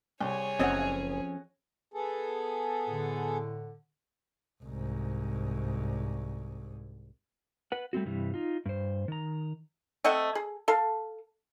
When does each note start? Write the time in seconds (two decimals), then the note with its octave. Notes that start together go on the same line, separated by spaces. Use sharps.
0.21 C2 G#4 C#5
0.59 F#1 F2 C4 C#4 D#5 F#5
1.94 B3 G#4 A4
2.88 A2 D3
4.63 C2 G#2
7.72 B4 F#5
7.93 G3 A3 C4 F#4
8.05 G2 C3 E3 G3
8.34 D#4 F4
8.66 G2 C5
9.08 D#3 A#5
10.04 A3 C4 D#5 F#5
10.35 G#4
10.68 A4 F5